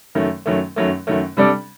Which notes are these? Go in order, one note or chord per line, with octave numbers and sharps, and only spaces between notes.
F#2 D#3 F#3 A3
F#2 D#3 F#3 A3
F#2 D#3 F#3 A3
F#2 D#3 F#3 A3
C3 G3 D4 A4 D5